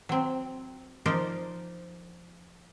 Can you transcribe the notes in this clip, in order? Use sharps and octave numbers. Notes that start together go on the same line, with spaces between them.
F#3 C4
F3 D#4 A#4 C5 D5